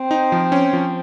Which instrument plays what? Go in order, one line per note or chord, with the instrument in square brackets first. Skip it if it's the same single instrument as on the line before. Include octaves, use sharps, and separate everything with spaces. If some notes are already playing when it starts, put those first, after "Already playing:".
Already playing: [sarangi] C4
[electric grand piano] D#4
F3
C#4
F3